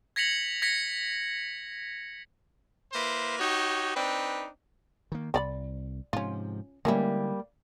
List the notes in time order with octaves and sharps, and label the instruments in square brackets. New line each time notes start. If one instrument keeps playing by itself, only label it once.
[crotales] G#6 A#6 B6 C#7 F7 F#7
G#6 A#6 B6 C#7
[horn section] A#3 E4 B4 C5
D#4 F#4 G4 C#5
C4 D4 D#4 B4
[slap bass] D#3 A#3
[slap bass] C2 [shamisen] C4 D5 B5
[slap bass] G#2 C3 F3 [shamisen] C#4 F4
[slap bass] D3 G#3 [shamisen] E3 C#4 E4 [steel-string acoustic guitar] G3 A#3